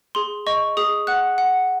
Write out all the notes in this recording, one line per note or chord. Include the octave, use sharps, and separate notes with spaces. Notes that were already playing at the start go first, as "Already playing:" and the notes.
G#4 C6
D#5 C#6
G#4 D#6
F#5 F#6
F#5